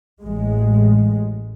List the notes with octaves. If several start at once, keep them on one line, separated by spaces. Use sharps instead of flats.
A1 G#3